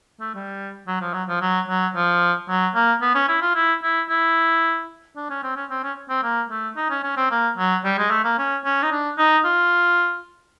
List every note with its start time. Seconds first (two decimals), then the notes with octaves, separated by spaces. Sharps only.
0.20 A3
0.34 G3
0.87 F#3
1.01 F3
1.14 F#3
1.28 F3
1.41 F#3
1.68 F#3
1.95 F3
2.49 F#3
2.75 A#3
3.01 B3
3.15 C#4
3.28 E4
3.42 F4
3.55 E4
3.83 E4
4.09 E4
5.16 D4
5.30 C#4
5.43 C4
5.56 C#4
5.70 C4
5.83 C#4
6.09 C4
6.23 A#3
6.50 A3
6.76 D#4
6.90 C#4
7.03 C#4
7.16 C4
7.31 A#3
7.57 F#3
7.84 G3
7.98 G#3
8.10 A3
8.24 A#3
8.38 C#4
8.65 C#4
8.83 D#4
8.91 D4
9.18 D#4
9.44 F4